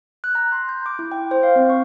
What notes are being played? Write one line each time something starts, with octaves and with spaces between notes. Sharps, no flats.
F#6
A#5
C6
G6
D6
E4
G5
C5
F5
C4
C#6